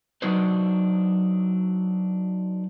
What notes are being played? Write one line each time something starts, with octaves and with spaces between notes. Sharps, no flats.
F#3 D4 D#4 F#4 B4 C5